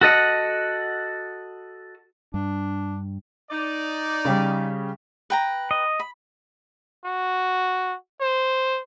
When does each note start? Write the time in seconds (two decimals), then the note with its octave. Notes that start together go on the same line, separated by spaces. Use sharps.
0.01 F#4 A4 D#5 F#5
2.34 G2 D4
3.51 D#4 D5
4.25 C#3 G3
5.30 B4 G5 A#5
5.71 D#5
5.99 B5
7.05 F#4
8.21 C5